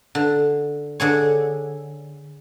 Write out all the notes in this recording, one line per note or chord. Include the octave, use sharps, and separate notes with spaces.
D3
D3 G#4 C#5